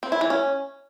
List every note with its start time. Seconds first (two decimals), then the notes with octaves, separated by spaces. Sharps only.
0.03 C4
0.12 E4
0.21 E3
0.30 C#4